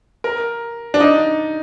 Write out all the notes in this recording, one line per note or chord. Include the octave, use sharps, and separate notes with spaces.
A#4
D4
D#4